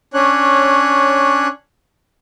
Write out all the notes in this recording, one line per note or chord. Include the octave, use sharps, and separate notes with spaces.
C#4 D4 C#5 F#6